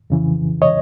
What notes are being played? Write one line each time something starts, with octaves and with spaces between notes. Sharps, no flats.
F2 C#3 E3
C#5 D#5